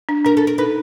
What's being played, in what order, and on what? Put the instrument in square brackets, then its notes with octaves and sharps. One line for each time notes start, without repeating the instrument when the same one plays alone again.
[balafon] D4
[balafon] D4 [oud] A#4
[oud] A4
A#4
[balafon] D#4 [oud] B4